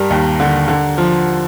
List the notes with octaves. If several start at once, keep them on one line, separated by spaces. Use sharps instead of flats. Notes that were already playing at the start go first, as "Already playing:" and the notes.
Already playing: G2 G3 A#4
D#2
D3
D3
F3